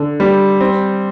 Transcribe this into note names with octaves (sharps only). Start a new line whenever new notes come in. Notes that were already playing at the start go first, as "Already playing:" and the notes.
Already playing: D3
G3
C4